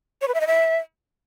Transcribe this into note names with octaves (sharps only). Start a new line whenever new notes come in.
C#5
B4
E5
D#5
E5